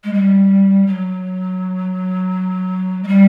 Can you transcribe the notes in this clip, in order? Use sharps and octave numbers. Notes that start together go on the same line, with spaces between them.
G#3
G3
F#3
G#3
G3